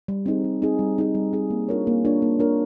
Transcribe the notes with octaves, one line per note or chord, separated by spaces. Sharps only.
G3
C4 D#4 G#4
G3
C4 D#4 G#4
G3
C4 D#4 G#4
G3
C4 D#4 G#4
A#3
D4 F4 A#4 C#5
A#3
D4 F4 A#4 C#5
A#3
D4 F4 A#4 C#5